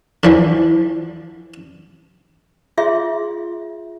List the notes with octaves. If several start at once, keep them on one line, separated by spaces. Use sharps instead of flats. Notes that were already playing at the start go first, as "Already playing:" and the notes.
D3 E3 F3
F4 G#4 E5 C6